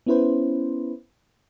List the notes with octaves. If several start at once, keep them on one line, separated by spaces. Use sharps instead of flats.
B3 C#4 E4 B4 C5